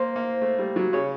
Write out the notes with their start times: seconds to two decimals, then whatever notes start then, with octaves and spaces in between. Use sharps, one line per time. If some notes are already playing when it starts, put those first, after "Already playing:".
Already playing: A#3 C5
0.16 A#3
0.41 A3
0.58 G3
0.76 F#3
0.93 C#3 C#5